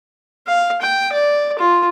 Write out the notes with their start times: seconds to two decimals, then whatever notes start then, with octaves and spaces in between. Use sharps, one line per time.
0.47 F5
0.82 G5
1.12 D5
1.59 F4